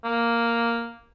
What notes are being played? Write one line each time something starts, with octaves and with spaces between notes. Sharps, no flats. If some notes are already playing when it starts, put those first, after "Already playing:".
A#3